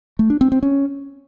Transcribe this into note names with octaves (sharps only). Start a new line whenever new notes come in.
A3
D4
C4
C4
C#4